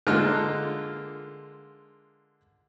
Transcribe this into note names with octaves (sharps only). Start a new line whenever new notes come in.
D3 G#3 A#3 F4 F6 F#6